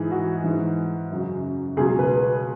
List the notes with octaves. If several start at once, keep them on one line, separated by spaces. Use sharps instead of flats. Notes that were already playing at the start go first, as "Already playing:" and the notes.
Already playing: G#2 E3 G#4
F#4
G#2 E3
F#2 C#3 F#3
C#2 B2 F#3 G#4
B4